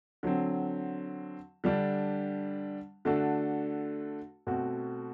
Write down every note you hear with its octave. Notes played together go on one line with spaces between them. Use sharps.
D3 F#3 C4
D3 G3 D4
D3 A3 D4 F#4 A4
B2 A3 C4 F#4